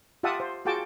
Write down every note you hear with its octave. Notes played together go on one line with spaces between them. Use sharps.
F4 G4 E5 F#5 A5 D#6
C5
F4 F#4 G#4 G5 A5 D6